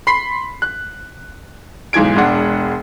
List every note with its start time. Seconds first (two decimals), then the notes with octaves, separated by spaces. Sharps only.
0.07 B5 C6 B6 C7
0.62 F#6
1.93 B1 G#2 E3 G#6 D7
2.16 E1 G#3 D4 F#5